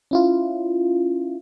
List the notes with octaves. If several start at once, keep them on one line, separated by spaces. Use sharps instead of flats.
C#4 E4 F4